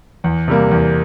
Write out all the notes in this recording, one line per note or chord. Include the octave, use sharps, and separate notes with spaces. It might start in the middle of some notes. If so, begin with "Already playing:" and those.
E2
C3 G3 A#3
E2